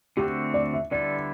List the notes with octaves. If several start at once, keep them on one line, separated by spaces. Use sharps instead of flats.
D3 A3 C4 F#4 G4
D5
E5
D3 G3 B3 E4 A4 D5